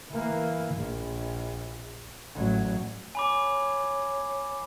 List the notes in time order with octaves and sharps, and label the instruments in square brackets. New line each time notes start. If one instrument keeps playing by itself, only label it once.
[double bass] E3 A#3
A#1
A1 F#3
[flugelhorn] C#5 [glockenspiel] G#5 B5 D6